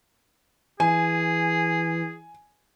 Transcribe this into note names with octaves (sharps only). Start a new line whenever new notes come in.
E3 G#4 G#5